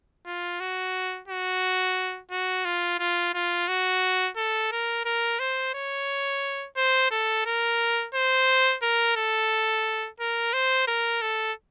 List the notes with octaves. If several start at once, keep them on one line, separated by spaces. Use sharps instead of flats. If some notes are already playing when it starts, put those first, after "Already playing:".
F4
F#4
F#4
F#4
F4
F4
F4
F#4
A4
A#4
A#4
C5
C#5
C5
A4
A#4
C5
A#4
A4
A#4
C5
A#4
A4